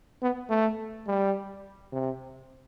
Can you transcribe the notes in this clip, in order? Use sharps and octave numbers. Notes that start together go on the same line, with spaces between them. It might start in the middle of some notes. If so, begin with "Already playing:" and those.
B3
A3
G3
C3